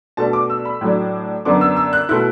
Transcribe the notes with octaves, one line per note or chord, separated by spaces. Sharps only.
B2 A3 D4 A5
D6
E6
B5
A2 F#3 A3 D4
F#2 D3 B3 D4 D6
E6
E6
F#6
B2 A3 E4 F#6